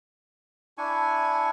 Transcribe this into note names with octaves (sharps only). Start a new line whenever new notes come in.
D4 E4 G#5 C#6